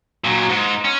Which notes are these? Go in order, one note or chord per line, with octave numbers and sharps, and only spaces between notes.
A#2 F#3
G#2
C#4